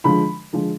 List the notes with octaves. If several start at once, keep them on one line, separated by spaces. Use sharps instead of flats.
D3 F3 G#3 B5
D3 F3 G#3